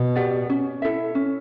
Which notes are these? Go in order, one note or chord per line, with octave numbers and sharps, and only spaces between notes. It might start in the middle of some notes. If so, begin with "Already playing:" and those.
Already playing: B2
G4 D5 F#5
C#4
E4 A4 E5
C#4